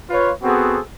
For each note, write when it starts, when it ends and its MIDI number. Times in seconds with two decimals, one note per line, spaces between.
0.10 0.32 65
0.10 0.32 71
0.10 0.32 73
0.43 0.79 59
0.43 0.79 60
0.43 0.79 66
0.43 0.79 68
0.43 0.79 69
0.43 0.79 72